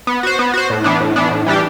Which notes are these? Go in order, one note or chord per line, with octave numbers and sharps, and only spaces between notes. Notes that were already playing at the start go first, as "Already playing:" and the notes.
B3
F#4 C5
B3
F#4 C5
A2
E3 B3 D4
A2
E3 B3 D4
A2
E3 G3 D4 G4